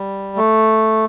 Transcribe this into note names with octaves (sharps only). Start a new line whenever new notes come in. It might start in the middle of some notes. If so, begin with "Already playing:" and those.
Already playing: G3
A3